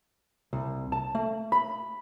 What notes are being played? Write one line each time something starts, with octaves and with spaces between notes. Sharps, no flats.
C2
A5
A3
B5